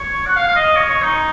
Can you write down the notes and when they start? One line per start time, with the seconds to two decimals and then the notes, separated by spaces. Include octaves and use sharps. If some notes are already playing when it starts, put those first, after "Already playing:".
Already playing: C#5
0.26 F#5
0.36 F5
0.48 F5
0.56 D#5
0.76 C#5
0.89 C#5
1.02 D#4